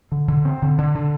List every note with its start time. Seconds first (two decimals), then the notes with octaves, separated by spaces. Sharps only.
0.12 D3
0.28 D3
0.45 C4
0.62 D3
0.78 D3
0.95 D3